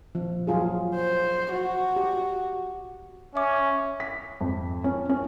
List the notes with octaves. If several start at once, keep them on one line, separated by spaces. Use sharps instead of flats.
F3
F#3 F4 G#4
C5
F#4
G4
C#4 E5 D6
B6
F2
C#4
C#4